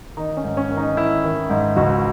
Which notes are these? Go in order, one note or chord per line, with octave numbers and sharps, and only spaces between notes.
D#3 D#4
C#4
G#2
C#4
D#3
D#4
D#3 E4
D#3
G#2
C#2 F#4